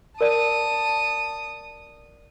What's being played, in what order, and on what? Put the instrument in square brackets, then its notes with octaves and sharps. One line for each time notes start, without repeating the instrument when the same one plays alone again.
[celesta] A#4 D5 D#7 [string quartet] A5 D#6